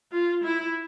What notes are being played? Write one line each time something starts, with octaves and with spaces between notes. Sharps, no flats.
F4
E4